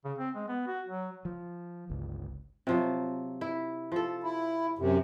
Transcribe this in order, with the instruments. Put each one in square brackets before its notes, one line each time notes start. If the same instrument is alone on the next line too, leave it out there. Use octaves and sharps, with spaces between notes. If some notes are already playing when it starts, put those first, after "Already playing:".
[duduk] C#3
C4
G#3
B3
F#4
F#3
[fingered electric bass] F3
G1 C#2
[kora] C3 F3 F#3
E4
F3 A4
[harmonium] E4
F#2 C3